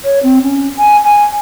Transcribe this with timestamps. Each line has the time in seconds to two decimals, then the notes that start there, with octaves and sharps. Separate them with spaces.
0.04 C#5
0.23 C4
0.42 C#4
0.77 G#5
1.04 G#5